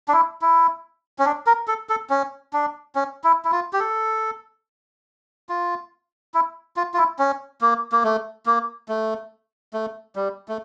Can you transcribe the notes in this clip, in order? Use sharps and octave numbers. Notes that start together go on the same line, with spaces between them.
D4
E4
E4
C#4
D4
A#4
A4
A4
C#4
D4
C#4
E4
E4
F4
G4
A4
F4
E4
F4
F4
E4
C#4
A#3
A#3
A3
A#3
A3
A3
G3
A3